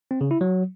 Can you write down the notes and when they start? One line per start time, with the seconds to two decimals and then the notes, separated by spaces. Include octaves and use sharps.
0.11 C4
0.21 C#3
0.31 E4
0.41 F#3